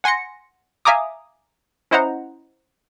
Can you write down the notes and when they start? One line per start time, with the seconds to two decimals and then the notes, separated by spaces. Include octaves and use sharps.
0.04 F#5 G#5 C6 A#6 C#7
0.85 E5 F5 G#5 A#5 D6 D#6
1.91 C#4 E4 C5 D#5 F#5 A#5